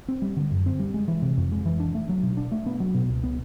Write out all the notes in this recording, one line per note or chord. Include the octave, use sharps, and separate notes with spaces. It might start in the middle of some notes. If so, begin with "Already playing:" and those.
C4
G3
D3
F#2
C4
G3
G#3
E3
C3
F2
G#3
E3
D4
A3
F#3
B2
D4
A3
B3
F#3
B2
C#2
B3